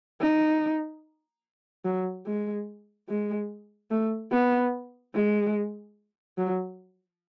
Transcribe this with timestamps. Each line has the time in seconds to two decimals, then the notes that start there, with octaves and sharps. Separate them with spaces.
0.21 D#4
1.85 F#3
2.26 G#3
3.09 G#3
3.91 A3
4.32 B3
5.15 G#3
6.38 F#3